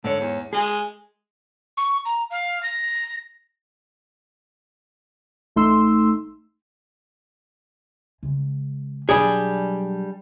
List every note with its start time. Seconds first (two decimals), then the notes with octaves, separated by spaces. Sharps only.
0.04 G#2 D3 C#5
0.20 E2
0.53 G#3 G#4
1.77 C#6
2.05 A#5
2.30 F5
2.63 A#6
5.56 A1 A3 D#4 C6 E6
8.23 C#3 G#3
9.09 B2 F#3 G3 D4 G#4